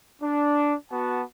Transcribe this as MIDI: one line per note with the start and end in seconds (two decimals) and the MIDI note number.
0.22 0.75 62
0.91 1.23 59
0.91 1.23 66
0.91 1.23 81